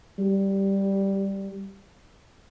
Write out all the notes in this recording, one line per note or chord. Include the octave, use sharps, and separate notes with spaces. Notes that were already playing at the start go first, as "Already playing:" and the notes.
G3